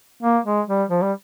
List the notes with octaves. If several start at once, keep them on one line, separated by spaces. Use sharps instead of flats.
A#3
G#3
G3
F3
G3